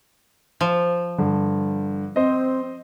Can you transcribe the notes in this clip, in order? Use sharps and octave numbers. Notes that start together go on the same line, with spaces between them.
F3
G2 D3
C4 C5 D#5